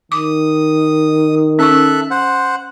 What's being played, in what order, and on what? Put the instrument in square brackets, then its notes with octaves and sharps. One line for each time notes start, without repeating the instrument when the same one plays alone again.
[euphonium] D#3 [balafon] D6 [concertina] D#6
[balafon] C#4 C#6 [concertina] A4 E5 F#6
[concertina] C5 F#5